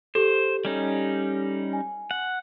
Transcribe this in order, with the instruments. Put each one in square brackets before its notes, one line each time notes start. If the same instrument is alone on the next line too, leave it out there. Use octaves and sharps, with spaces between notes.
[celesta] G4 A4 [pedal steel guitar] C5
[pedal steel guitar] G3 C#4 D#4
[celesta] G#5
[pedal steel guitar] F#5